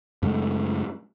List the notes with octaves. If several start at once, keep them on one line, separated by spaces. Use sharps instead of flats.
F#2 C#3 G#3 A3